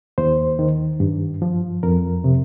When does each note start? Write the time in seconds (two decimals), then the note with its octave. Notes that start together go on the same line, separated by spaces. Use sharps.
0.18 D#2 C5
0.59 D#3
1.00 G2
1.42 F3
1.83 F2 A#4
2.24 C3